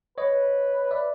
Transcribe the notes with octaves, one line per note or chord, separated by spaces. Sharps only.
B4 C#5 D#5
D5 E5